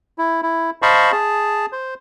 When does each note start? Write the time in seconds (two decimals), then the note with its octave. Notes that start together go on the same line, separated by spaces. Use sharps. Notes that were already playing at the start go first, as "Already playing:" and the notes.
0.18 E4
0.43 E4
0.82 C5 D#5 F5 A5 B5 C#6
1.12 G#4 A5
1.72 C5